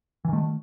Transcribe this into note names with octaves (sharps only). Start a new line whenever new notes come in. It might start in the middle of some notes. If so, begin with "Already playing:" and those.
D#3 E3 A3